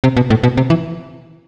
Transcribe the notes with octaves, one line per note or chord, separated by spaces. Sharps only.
C3
B2
A2
B2
C3
E3